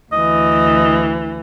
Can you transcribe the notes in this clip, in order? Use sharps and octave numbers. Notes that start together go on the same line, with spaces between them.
D2 E3 D#5